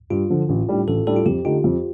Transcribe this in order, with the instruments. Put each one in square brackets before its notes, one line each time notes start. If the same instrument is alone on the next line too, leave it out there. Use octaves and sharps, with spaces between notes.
[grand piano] G2 [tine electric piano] F4
[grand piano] D3 F3
A1
A2 G3 D4
[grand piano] A1 [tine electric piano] A4
[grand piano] A2 G3 D4 [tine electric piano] A4
[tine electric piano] F4
[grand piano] F2 [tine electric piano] G4
[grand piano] D3 A3 D#4 G4 [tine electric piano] F4
[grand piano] F2